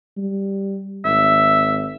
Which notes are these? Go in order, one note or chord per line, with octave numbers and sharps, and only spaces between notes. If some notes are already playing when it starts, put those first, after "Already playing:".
G3
G#1 E5